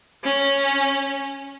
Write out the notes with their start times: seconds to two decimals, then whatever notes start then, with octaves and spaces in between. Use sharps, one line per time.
0.24 C#4